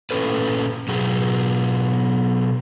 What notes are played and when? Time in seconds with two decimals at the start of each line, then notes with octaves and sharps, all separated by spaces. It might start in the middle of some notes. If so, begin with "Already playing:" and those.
0.11 A#2 G3 C#4 A4 B4
0.88 B2 F#3 G#4